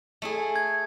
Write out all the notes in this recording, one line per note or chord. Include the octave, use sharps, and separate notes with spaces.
A3 E4 G#4
G#6